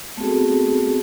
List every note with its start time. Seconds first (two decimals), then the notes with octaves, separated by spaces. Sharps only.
0.17 A3 B3 C4 F#4 G#4 A4